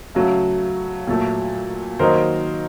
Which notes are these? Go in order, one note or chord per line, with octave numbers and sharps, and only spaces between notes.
C#3 F#3 A3
A#2 F#3 A3
D#3 F#3 A#3 D#4 A#4 C5